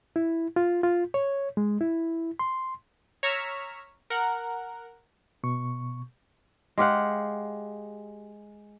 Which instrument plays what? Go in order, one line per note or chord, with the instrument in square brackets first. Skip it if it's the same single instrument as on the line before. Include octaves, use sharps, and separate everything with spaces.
[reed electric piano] E4
F4
F4
C#5
G#3
E4
C6
[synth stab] C#5 A#5 C#6 E6 F6 B6
A#4 F#5
[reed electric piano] B2 C#6
[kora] G#3 G4 F5 F#5